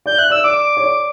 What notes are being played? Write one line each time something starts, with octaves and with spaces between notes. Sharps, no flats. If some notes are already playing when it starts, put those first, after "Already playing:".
D5 G6
E5 F#6
D5 E6
D5 D6
C#5
D5